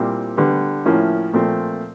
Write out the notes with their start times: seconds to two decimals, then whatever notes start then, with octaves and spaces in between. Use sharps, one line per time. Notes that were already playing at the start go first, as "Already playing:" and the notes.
Already playing: A#2 G3 C4 E4
0.37 D3 G3 B3
0.85 A2 F3 A#3 C#4 E4
1.34 A#2 F3 A3 C4